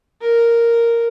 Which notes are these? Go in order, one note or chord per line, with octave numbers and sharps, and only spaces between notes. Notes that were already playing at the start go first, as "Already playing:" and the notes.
A#4